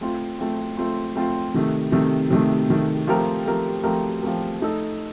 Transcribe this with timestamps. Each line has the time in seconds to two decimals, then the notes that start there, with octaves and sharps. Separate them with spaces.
0.01 A3 C4 F4
0.39 A3 C4 F4
0.77 A3 C4 F4
1.16 A3 C4 F4
1.54 C3 D#3 A3
1.92 C3 D#3 A3
2.30 C3 D#3 A3
2.69 C3 D#3 A3
3.07 F3 A3 C4 G4 A#4
3.46 F3 A3 C4 G4 A#4
3.83 F3 A3 C4 G4 A#4
4.22 F3 A3 C4 G4 A#4
4.60 A3 D#4 A4